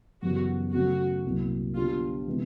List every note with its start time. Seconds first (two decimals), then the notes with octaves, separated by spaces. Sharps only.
0.22 F#2 C#3 E3 G3 B3 F#4
0.73 C#3 F#3 A3 F#4
1.25 C2 A#2 F#3
1.75 D3 G3 B3 D4 F4
2.27 C3 E3 G#3 B3